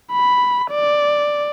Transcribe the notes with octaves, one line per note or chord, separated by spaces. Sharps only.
B5
D5